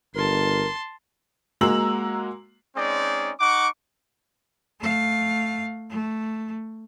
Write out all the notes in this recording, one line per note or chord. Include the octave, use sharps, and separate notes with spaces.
G1 A#4 A5 C6
G#3 A#3 F#4 A#5 E6 F#7
G#3 C4 C#4 D#4 D5
D#4 F#5 C#6 D6
A3 F5
A3